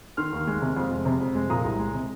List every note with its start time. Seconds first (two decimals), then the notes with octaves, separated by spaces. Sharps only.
0.17 D#3 C6 F6
0.33 D#2
0.47 G#3
0.62 C3
0.77 F2
0.91 G#3
1.06 C3
1.20 F2
1.35 G#3
1.50 A#2 A#5 D#6
1.65 C2
1.79 G#3
1.94 C3